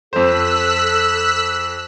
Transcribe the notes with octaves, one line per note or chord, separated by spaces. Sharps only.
F2 A4 C5 E6 F#6 B6